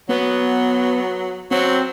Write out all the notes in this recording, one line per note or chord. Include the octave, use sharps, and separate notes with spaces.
F#3 B3
F#3 C4